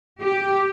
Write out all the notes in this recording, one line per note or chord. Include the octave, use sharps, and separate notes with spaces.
G4